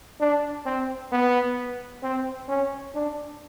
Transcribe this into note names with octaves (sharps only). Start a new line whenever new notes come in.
D4
C4
B3
C4
C#4
D4